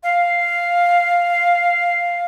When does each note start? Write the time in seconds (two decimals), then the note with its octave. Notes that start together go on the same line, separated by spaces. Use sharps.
0.03 F5